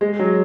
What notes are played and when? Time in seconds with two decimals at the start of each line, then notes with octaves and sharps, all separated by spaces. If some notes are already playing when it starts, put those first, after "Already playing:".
0.01 G#3
0.19 F#3